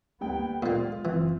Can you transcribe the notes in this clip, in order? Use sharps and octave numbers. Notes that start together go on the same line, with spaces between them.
D2 G3 A#3 B3 G5
A#2 G#3 A#3 F4
F#1 E3 C4